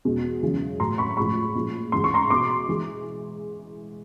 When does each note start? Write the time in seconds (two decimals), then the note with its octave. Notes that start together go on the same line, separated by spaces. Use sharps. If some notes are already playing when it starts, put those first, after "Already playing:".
0.05 E2 B2 G#3
0.42 F#2 C#3 E3 G#3
0.80 A2 F#3 A#5 C6
0.98 B5 C#6
1.17 A2 F3 G#3 B5 C#6
1.55 A#2 F3 G#3
1.92 G#2 E3 G#3 C6
2.04 C#6
2.14 A#5 C6
2.30 B2 G#3 C6 D6
2.68 E3 G#3